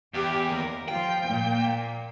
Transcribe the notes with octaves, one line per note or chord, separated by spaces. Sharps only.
E2 G4
D#2 A#4
F3 F4 G5
A#2 A#3